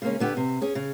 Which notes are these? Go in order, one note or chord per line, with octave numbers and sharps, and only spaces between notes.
C#3 G#3 A#3 C#4
D3 B3 D4 G4
C3
C#4 G#4
C#3